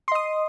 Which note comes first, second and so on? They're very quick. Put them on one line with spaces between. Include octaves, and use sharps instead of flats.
C6 D#5 D#6